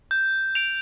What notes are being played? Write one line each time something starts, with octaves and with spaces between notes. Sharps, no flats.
G6
D7 F7